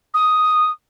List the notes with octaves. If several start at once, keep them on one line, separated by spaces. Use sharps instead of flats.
D#6